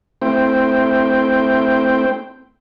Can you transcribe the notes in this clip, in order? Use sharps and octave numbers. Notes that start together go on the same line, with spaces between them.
A3 C4 E4 C5 G5